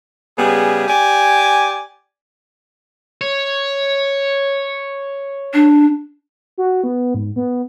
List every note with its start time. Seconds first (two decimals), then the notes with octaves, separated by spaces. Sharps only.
0.38 C#3 G3 B3 G#4
0.88 G4 D5 G#5
3.21 C#5
5.54 D4
6.58 F#4
6.84 B3
7.14 G#2
7.36 B3